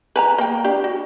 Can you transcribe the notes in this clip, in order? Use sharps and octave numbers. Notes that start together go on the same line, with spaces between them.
B4 A5 A#5
A#3 G5
D4 G4
F#4